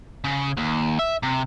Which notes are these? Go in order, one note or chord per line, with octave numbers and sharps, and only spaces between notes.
C#3
D#2
E5
C3